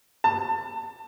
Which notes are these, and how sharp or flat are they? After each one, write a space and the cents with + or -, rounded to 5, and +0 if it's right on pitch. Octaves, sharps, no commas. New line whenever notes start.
A5 +25